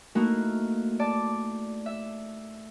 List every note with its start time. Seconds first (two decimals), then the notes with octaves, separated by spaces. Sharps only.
0.15 A3 A#3 D#4 E4 F#4 A#4
0.99 D5 A5
1.86 E5